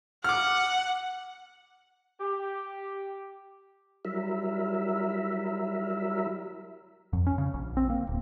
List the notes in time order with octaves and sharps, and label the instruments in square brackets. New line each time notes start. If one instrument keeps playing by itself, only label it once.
[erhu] F#5 [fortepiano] D6 F6
[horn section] G4
[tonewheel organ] F#3 G3 E4 A#4 E5
[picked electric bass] F2
C#4
C#3
A#1
C4
A#3
D1